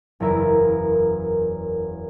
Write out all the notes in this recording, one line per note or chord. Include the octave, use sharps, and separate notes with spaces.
F#1 E2 E4 A#4 E5 E7